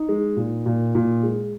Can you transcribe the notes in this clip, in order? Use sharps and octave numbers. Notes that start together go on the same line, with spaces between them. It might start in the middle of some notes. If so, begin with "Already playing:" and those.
Already playing: D#4
G#3
A#2
A#2
A#2
G#3